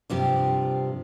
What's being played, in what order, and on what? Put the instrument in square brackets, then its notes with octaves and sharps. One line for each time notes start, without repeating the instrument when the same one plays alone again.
[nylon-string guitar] G2 C3 F3 G4